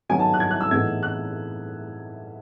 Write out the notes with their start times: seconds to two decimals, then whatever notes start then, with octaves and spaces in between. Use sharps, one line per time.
0.09 D#3 F#3 B3 D#4 G#5
0.19 A5
0.34 F#6
0.40 G#6
0.51 F#6
0.61 E6
0.71 A2 E3 G#3 B3 D#4 G#6
1.03 F#6